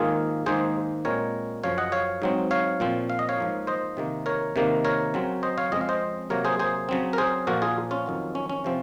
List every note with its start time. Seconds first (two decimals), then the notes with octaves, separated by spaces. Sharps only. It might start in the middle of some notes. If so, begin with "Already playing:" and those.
Already playing: G#2 D#3 A#3 F4 G#4
0.46 G#2 D#3 A#3 G#4 C5
1.05 A#2 G#3 C4 A#4 C#5
1.64 F#2 C#3 F3 C#5 F5
1.78 D#5 F#5
1.92 C#5 F5
2.22 G#2 F#3 C4
2.51 C#5 F5
2.80 A#2 F3 C4
3.10 F5
3.19 D#5
3.29 C#5 F5
3.38 G#2 F3 A#3
3.67 C5 D#5
3.97 C3 D#3 A#3
4.26 A#4 C#5
4.56 C3 D#3 A#3
4.85 A#4 C#5
5.14 C#3 F#3 C4
5.43 C5 D#5
5.58 C#5 F5
5.72 F2 C#3 G#3 C4 D#5
5.81 F5
5.89 C5 D#5
6.30 C3 F#3 A#3 A#4 C#5
6.45 G#4 C5
6.59 G#4 C5
6.89 C#3 F#3 C4
7.13 A#4
7.18 G#4 C5
7.47 A#2 F3 A#3 F#4 A#4
7.62 F4 G#4
7.91 C#4 F4
8.06 F2 D#3 F#3
8.35 C#4
8.49 C#4
8.64 C3 F3 C4